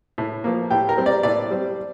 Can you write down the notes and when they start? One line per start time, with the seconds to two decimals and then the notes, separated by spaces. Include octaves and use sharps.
0.18 A2
0.44 F3 A#3
0.71 A2 G4
0.89 A#4
0.97 G3 C4
1.06 D5
1.23 A2 D5
1.51 G3 C4